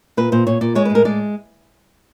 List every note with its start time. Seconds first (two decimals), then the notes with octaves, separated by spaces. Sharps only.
0.17 A#2 B4
0.32 A#2 C5
0.47 A#2 C#5
0.61 A#2 D5
0.75 G#3 C#5
0.85 B4
0.90 A2
0.95 A#4
1.05 G#3 D5